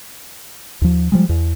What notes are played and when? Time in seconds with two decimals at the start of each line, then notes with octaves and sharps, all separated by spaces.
0.82 D#2 F3
1.12 F3 G3 G#3
1.29 E2